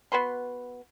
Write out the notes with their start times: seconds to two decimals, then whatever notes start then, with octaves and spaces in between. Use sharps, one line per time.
0.12 B3 F#4 B4 C6